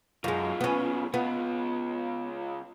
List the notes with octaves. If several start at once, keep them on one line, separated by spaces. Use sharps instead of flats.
B1 F#2 G#3 F4
B3 C#4
C#2 B3 F4